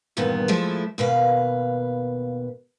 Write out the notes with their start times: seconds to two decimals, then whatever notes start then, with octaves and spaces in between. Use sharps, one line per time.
0.17 E2 G2 A#2 D#3 B3
0.48 F3 G#3 A3 E4
0.98 D#2 B2 B4 F5